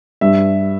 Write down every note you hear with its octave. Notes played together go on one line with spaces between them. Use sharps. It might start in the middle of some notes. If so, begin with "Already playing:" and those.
G2 E5